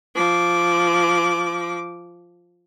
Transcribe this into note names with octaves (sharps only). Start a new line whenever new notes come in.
F3 D6